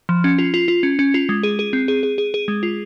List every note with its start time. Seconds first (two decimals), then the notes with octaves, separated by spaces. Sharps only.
0.09 F3
0.24 C#4
0.38 F4
0.54 F4
0.68 F4
0.83 C#4
0.99 C#4
1.14 F4
1.29 G#3
1.43 G#4
1.59 G#4
1.73 C4
1.88 G#4
2.03 G#4
2.18 G#4
2.34 G#4
2.48 G#3
2.63 F4